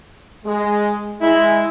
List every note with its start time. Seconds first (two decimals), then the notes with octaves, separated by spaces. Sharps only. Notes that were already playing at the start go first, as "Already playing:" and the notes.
0.45 G#3
1.21 G#3 E4